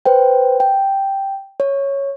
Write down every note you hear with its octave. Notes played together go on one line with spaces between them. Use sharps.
B4 C5 G5
G5
C#5